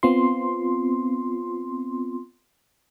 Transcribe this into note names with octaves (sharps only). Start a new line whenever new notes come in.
B3 C4 F4 C6